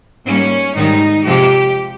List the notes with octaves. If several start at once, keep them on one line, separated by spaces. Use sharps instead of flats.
G#2 G3 A#3 C#4
G#2 D#3 G3 D#4
F2 C3 F3 G#3 G4